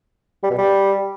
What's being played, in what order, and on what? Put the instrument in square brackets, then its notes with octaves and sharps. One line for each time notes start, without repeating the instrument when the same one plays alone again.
[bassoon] G3
B2
G3